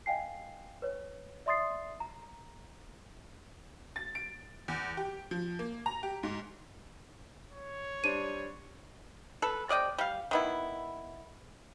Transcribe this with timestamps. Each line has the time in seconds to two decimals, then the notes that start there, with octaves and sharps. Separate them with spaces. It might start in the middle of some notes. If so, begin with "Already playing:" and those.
0.06 D#5 F5 G5 G#5 C7
0.82 B4 C#5
1.46 D5 E5 C6 D#6 A6 C7
2.00 A#5
3.96 A6
4.15 D7
4.68 E2
4.97 G4
5.31 F3
5.59 A#3
5.86 A#5
6.03 G4
6.23 G#2
7.53 C#5
8.04 G3 D4 C5 D#7
9.42 A4 B4
9.69 C3 D5 D#5 G5
9.98 G3 F5
10.31 D#3 B3 E4